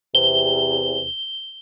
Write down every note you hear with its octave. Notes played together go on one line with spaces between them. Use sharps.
E2 C3 G7